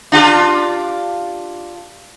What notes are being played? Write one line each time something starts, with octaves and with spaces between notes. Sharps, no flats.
D4 F4 G4